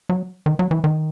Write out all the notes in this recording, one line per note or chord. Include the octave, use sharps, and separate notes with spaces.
F#3
D#3
F#3
E3
D#3